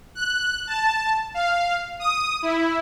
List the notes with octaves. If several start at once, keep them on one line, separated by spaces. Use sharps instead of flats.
F#6
A5
F5
D#6
E4